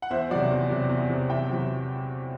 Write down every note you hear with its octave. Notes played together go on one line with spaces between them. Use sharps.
F#5
E2 C5 E5
C3 F#3 D5 F#5
E2
C3 F#3
E2
C3 F#3
E2 E5 G5
C3 F#3